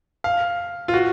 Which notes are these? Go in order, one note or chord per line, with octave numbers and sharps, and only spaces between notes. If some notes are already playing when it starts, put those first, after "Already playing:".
F5
F4
F#4